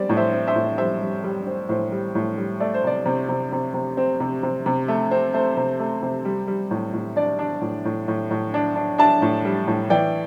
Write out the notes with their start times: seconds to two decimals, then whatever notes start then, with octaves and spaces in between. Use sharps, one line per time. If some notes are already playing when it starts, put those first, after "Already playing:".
Already playing: G3 C4 D5
0.09 A2
0.17 C5 E5
0.33 C4
0.47 C5 E5
0.55 A2
0.78 G3 C5 E5
1.01 G3
1.24 G3
1.47 C4
1.69 A2 C5
1.92 G3
2.15 A2
2.38 G3
2.60 A3 D5
2.74 C5
2.84 C3 D5
3.06 C3
3.29 C3
3.52 C3
3.74 C3
3.97 C4
4.20 C3
4.43 C3
4.66 C3
4.88 A3
5.11 C4
5.34 A3 C5
5.57 C3
5.80 A3
6.03 C3
6.25 G3
6.47 G3
6.71 A2
6.93 A2
7.16 D4 D5
7.39 D4
7.61 A2
7.85 A2
8.08 A2
8.31 A2
8.54 D4
8.75 D4
8.98 D4 E5 A5
9.22 A2
9.45 G3
9.67 A2
9.90 E3 D5 G5